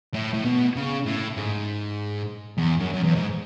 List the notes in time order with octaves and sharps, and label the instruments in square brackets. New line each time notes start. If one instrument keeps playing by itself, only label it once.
[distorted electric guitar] A2
A2
B2
C#3
A2
G#2
E2
F#2
F#2
E2
G#2